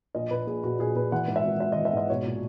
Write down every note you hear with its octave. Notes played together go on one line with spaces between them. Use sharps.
A#1 D#5
A#2 B4
A#1 G#4
A#2 F#4
A#1 G#4
A#2 B4
E3 F#5
G#2
E5
G#1
G#1 E5
D#5
E3
E5
G#2 D#5
B1 C#5
A#2